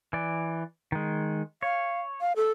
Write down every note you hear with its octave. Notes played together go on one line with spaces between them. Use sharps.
E3 D5
D#3 G#3
C#5 F5
F5
A4